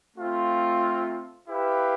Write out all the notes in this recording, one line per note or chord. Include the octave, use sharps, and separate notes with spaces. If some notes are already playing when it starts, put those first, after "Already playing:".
A3 C4 F4
E4 G4 B4 F5